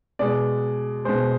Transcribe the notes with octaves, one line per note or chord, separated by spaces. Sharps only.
B2 G#3 D5
B2 G#3 C5